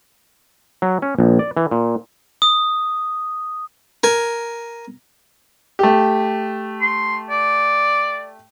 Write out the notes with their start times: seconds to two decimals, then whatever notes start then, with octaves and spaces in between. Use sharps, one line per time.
0.82 F#3
1.02 C#4
1.19 A#1
1.39 D5
1.57 E3
1.71 A#2
2.42 D#6
4.04 A#4 G#5
5.79 A3 G4
6.81 C6
7.30 D5